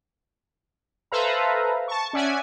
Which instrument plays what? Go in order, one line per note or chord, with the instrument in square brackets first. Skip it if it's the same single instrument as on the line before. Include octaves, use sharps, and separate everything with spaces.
[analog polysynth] A4 B4 C5 E5 F5 A#5
A5 C#6
C#4 D5 E5 F#5 G#5